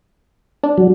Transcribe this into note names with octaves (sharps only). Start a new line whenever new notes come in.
D4
F#3